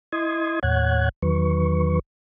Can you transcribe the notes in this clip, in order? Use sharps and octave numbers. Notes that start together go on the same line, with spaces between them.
E4 D#5 C6 D#6 G#6
D#2 A2 C#5 F#5 F#6 G#6
E2 D#3 F#3 B4 C#6